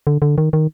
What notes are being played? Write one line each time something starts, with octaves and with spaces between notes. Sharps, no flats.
D3
D3
D#3
D#3